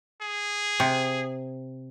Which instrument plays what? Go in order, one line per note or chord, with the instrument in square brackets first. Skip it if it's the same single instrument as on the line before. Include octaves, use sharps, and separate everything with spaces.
[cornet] G#4
[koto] C3